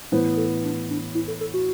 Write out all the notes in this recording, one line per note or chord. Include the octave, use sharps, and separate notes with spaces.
A2 E3 B3 C5
A4
D4
D4
E4
A4
A4
F#4